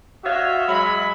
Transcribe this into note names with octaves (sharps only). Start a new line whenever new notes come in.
F4 F#4 C#5 D#5 E5
F#3 G#3 E5 B5